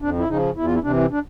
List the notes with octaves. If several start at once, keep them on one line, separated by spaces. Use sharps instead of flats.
F2 D4
E4
C#3 F3 D#4
E2 E4
F4
E4
C3 E3 D4
D4